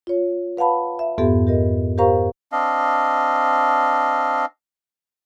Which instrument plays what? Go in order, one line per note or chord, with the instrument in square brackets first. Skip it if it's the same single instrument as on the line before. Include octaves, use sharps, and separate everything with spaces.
[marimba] F4 C#5
B4 F5 F#5 A5 B5
E5
F2 G#2 B3 G4 A4 E5
G4 A#4 D#5
G4 A#4 C5 F5 A#5 C#6
[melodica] C4 D4 D#5 F5